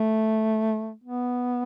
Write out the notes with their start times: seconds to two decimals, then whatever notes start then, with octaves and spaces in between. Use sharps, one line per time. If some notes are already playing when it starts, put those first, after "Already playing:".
Already playing: A3
1.04 B3